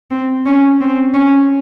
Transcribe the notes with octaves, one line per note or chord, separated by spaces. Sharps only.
C4
C#4
C4
C#4